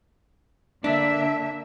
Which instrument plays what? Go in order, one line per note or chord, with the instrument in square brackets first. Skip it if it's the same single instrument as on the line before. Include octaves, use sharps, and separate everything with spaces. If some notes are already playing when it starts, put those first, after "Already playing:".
[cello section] D3 A#3 E5 [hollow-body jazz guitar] D4